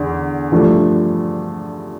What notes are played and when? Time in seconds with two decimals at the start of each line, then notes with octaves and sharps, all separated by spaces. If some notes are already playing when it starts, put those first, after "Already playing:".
Already playing: E2 D3
0.52 G2 F3 A3 D4